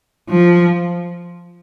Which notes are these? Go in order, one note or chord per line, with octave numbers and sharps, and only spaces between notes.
F3